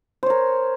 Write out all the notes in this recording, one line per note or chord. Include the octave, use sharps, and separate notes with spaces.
A#4 C5 C#5